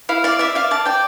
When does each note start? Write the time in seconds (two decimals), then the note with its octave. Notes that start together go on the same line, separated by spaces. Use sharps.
0.09 E4 F5
0.24 D5 F5
0.39 D5 E5
0.55 D5 F5
0.71 D5 A5
0.86 D5 G5